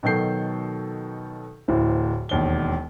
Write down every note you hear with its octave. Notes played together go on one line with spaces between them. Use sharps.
B2 D#3 F#3 A4 G6 C7
D1 A2 E3 C5
E1 D#2 G7